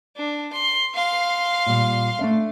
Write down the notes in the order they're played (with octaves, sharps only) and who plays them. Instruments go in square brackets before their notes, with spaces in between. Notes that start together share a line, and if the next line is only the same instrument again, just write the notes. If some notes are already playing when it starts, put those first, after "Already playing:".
[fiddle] D4
C6
F5 C6
[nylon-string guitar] A#2 G3
A3 D4 E5